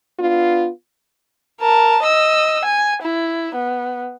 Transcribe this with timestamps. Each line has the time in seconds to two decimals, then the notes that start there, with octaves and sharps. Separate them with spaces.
0.18 B3 D4 F4
1.61 A#4 A5
2.03 D#5 E6
2.65 G#5
3.03 E4
3.55 B3